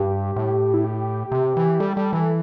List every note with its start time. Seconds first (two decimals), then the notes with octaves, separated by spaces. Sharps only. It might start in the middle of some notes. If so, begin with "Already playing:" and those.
Already playing: G2 G4
0.36 A2
0.74 E4
0.84 G4
1.32 C3
1.57 E3
1.80 G3 A4
1.97 G3
2.13 E3